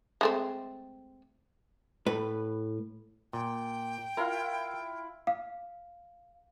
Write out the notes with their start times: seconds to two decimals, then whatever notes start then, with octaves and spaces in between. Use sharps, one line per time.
0.21 G#3 A3 C4
2.06 A2 B4
3.33 A#2 G5
4.17 E4 F4 A#4 F5
5.27 F5